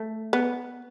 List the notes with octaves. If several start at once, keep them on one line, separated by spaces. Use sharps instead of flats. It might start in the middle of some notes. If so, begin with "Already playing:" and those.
Already playing: A3
B3